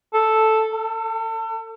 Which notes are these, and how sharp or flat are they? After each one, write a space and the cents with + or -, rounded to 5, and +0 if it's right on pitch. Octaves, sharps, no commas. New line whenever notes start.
A4 +0
A4 +35